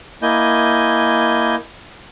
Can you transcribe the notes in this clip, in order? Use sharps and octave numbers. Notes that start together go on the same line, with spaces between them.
A#3 E4 D#5 G#5 G6